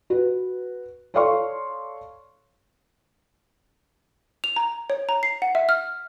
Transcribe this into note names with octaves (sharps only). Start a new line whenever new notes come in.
F#4 B4
A4 C#5 D5 F5 C6 C#6
F7
A#5
C#5
A#5
C7
F#5
E5
F6